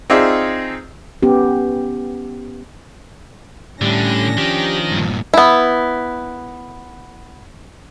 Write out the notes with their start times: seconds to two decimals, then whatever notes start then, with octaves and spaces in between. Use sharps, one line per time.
0.10 C4 D#4 F4 G#4 D5 E5
1.23 B3 C#4 G4
3.82 A2 D3 G3 C#4 D4 A#6
4.38 D#3 F3 G4
4.92 G2 A#2
5.34 B3 E4